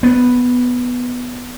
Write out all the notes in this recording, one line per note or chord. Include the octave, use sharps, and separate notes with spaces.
B3